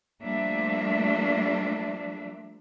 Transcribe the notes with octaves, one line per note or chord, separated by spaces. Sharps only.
F3 G3 A3 A#3 D4 E5